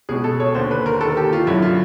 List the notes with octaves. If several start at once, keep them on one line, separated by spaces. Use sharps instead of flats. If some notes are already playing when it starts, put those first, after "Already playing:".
C#2 B2 G#4
A4
C#5
D#2 D3 C5
B4
A#4
D#2 D#3 A4
G4
F4
F#2 D3 E4
F4